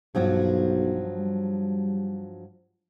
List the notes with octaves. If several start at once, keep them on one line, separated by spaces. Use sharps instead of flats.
B1 G2 F3 F#3
G3